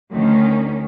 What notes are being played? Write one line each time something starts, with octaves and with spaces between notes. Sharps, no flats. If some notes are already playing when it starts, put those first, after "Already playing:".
D2 D#3 C#4